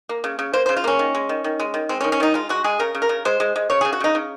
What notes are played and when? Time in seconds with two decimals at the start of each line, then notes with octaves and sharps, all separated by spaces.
0.09 A#3
0.24 C#3
0.39 C#3
0.54 A#3 C5
0.66 C#3 C5
0.76 F4
0.84 A#3 C#4
0.99 D#3
1.15 G#3
1.29 D#3
1.44 D#3
1.60 G#3
1.74 D#3
1.89 G#3 C4
2.01 C#4
2.04 D#3
2.12 C#4
2.20 D#3 D#4
2.34 G#3 F4
2.49 G#3 F#4
2.64 G#3 G#4
2.79 C#3 A#4
2.95 C#3
3.02 A#4
3.09 C#3
3.25 G#3 C5
3.40 G#3
3.56 G#3
3.70 C#3 C#5
3.81 C#3 G#4
3.93 F#4
4.00 C#3 D#4
4.15 C#3